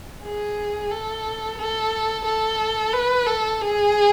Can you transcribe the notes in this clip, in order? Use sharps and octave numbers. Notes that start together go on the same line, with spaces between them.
G#4
A4
A4
A4
B4
A4
G#4